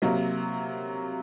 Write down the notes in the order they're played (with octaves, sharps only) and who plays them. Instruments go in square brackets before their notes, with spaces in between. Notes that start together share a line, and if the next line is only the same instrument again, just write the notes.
[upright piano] C3 F#3 A#3